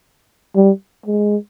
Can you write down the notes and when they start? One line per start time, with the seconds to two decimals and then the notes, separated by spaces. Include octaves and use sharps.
0.56 G3
1.06 G#3